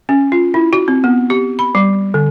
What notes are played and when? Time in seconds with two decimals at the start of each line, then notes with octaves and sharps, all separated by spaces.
0.09 C#4
0.32 F4
0.54 E4
0.73 F#4
0.88 C4
1.04 B3
1.30 G4
1.59 B5
1.75 G3
2.14 D3